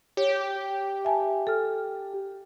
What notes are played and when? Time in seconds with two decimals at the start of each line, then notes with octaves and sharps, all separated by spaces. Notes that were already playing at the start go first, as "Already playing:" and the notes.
0.17 G4 C#5
1.05 E5 G#5 A5
1.47 A4 F6